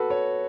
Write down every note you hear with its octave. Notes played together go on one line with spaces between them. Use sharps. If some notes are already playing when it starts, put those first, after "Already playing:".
Already playing: F#4 A4 B4
C#5